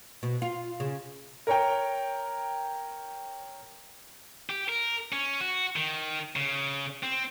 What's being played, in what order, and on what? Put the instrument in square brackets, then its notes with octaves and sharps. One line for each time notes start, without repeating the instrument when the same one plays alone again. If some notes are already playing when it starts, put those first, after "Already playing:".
[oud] B2
F4
C#3
[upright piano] A#4 C#5 G5
[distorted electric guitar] G4
A#4
C#4
F#4
D#3
C#3
C4